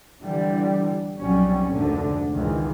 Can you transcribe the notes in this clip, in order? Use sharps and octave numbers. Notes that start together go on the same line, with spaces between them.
D3 E3 G3
B1 F2 F#3 G3 C#4
F1 D2 G#2 D3
C#2 G#2 D#3 E3